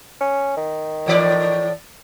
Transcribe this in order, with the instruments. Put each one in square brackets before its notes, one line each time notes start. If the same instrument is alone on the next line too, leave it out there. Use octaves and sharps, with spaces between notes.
[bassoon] C#4
D#3
[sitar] A2 E3 D5